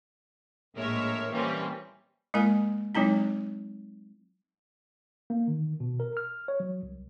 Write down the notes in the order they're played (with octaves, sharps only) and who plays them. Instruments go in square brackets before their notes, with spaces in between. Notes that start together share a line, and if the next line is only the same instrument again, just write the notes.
[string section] A#1 A2 G#3 A#4 C#5 E5
E3 G3 A#3 C4 C#4
[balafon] G#3 A#3 E4 A#4 G#5
F#3 G#3 C4 D#4 E4
[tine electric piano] A#3
D#3
B2
A#4
F6
C#5
F#3
C2